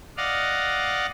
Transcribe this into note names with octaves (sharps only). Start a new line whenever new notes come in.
D5 D#5 F5 F#5